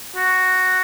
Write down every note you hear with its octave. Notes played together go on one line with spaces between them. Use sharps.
F#4